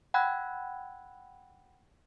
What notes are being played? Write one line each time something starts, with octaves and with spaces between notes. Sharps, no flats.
F#5 G5 B5 E6 F#6 G#6